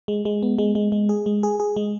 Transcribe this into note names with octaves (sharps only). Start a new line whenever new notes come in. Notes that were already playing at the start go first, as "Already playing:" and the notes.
G#3
G#3
B3
G#3
G#3
G#3
G#4
G#3
G#4
G#4
G#3